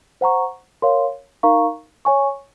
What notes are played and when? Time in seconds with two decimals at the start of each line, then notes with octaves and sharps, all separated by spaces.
0.21 C5 F#5 A#5 C#6
0.82 A#4 C#5 F5 C6
1.43 D#4 A#4 F5 A#5 C#6
2.05 C#5 G#5 C#6